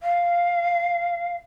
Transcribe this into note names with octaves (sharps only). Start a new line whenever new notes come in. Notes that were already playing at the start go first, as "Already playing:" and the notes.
F5